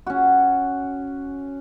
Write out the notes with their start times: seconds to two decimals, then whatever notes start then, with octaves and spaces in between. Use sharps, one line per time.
0.07 C#4 F#4